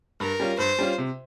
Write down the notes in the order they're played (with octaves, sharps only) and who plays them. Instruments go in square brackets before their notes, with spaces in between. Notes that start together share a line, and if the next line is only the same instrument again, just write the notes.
[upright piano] G2 [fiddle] A#4
[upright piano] G3 C#4 F4
[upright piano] G2 [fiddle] C5
[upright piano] G3 C#4 F4
C3